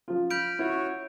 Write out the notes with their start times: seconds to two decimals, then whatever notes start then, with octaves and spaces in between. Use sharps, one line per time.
0.08 F3 F4
0.31 B5 F6 G6 D7
0.59 E4 F#4 C#5